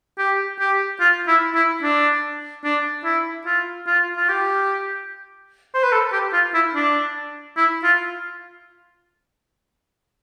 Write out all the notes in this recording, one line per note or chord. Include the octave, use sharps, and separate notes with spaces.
G4
G4
F4
E4
E4
D4
D4
E4
F4
F4
F4
G4
C5
B4
A4
G4
F4
E4
D4
E4
F4